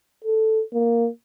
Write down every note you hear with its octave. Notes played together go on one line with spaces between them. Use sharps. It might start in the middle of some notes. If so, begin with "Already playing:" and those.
A4
A#3